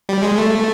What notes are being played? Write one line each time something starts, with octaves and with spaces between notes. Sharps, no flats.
G3
G#3
A3